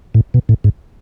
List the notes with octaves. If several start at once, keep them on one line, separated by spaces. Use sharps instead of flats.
A2
B2
A2
G#2